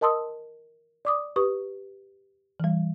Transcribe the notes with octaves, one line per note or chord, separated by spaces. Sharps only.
A#4 D#5 A5 C6 D#6 E6
D5 D6 D#6
G4 B4 C#6 D#6
E3 G3